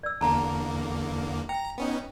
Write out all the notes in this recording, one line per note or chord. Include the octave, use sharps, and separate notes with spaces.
D5 E6
E2 D3 A#3 A5 A#5
G5 A#5
B3 C#4 D#4